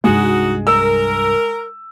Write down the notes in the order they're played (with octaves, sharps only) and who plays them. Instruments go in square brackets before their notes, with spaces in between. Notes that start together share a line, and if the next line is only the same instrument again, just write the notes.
[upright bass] C2 G2 [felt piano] G#3 [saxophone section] D#4 F#4
[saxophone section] A#4 [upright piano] E6